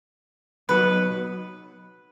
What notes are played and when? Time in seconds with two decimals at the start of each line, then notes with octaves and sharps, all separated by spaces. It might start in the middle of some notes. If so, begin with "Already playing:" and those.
0.69 B1 B2 F#3 B4